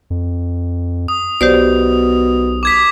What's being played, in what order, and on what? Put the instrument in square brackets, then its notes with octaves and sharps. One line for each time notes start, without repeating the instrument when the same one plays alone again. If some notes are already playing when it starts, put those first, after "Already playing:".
[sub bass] F2
[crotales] D#6
[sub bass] B1 [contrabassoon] B2 [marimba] G4 C5 D5
[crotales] D6 G#6 B6